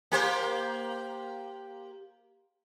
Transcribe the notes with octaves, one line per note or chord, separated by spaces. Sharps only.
A#3 G4 C5